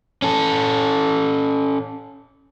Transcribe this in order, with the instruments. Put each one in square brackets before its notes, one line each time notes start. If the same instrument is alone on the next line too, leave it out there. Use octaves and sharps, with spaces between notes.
[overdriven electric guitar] C#4 A4